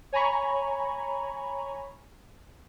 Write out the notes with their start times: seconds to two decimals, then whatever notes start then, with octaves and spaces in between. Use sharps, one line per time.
0.13 C#5 G#5 A#5 B5 C#6